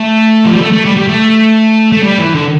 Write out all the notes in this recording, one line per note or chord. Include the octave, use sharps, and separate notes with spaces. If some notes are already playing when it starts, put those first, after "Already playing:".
Already playing: A3
F3
G3
A3
A3
G3
G3
A3
A3
G3
E3
D3